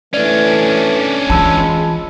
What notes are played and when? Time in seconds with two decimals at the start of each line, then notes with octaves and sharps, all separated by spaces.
0.14 E3 A3 C#4 D4 D5
1.30 E3 G#3 F4 A5 B5 E6